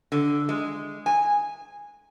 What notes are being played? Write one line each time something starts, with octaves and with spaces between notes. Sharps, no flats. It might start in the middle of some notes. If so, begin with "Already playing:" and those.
D3
G#3
G#5